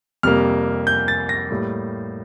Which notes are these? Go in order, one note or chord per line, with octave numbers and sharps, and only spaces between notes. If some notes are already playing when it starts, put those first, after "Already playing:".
F2 C3 G3 A#3 F6
G6
A6
A#6
A2 G3 A#3